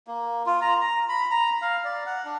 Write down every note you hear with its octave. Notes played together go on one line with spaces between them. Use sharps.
A#3
F4
A#5
A#5
B5
A#5
F5
D5
F#5
D4